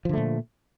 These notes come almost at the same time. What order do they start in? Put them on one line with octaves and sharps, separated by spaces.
F3 D3 A3 A#2